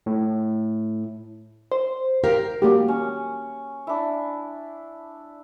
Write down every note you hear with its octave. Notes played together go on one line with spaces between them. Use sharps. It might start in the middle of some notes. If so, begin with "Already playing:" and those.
A2
C5
G4 A#4 F5
A#3 F#4 G4
C#4
D4 E4